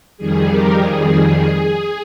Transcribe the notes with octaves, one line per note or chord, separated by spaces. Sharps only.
F2 D#3 G3 G#4
G4 A#4
G#4